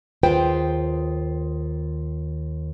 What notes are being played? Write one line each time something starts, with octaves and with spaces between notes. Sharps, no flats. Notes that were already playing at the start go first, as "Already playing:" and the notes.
D#2 F4 G#4 B4 C5 G5